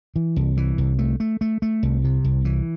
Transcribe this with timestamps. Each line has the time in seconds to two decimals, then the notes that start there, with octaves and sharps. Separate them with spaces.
0.16 E3
0.36 C2
0.57 E3
0.78 C2
0.99 A3
1.20 A3
1.41 A3
1.62 A3
1.83 C2
2.04 C3
2.25 C2
2.45 E3